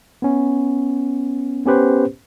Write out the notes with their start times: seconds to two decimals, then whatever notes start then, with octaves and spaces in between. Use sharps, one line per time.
0.22 B3 C#4
1.66 B3 C#4 G4 B4 C5